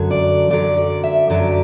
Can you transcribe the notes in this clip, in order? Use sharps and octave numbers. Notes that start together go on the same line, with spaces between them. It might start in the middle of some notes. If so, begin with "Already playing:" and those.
Already playing: F#2 D3 F#3
D5
F#2 D3 F#3 D5
D5
E5
F#2 D3 F#3 D5